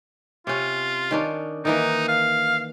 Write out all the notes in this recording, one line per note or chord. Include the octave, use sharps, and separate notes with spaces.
C3 C#4 F4
D#3 C#4 D4
D#3 E3 A#3 D#4
F5